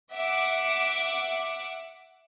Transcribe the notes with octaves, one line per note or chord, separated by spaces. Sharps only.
E5 F#5 D6